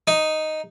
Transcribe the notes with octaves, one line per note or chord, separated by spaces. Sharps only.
D#4